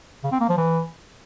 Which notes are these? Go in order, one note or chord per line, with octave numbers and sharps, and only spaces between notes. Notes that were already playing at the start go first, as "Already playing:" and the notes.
C#3
C4
A#3
F3
E3